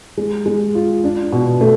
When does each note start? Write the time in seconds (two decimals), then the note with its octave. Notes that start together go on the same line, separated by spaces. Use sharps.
0.17 G#3
0.46 G#3
0.75 F4
1.04 D4
1.32 B2
1.61 A3